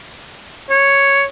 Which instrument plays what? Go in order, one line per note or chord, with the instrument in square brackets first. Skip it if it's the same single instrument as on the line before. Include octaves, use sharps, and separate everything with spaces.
[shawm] C#5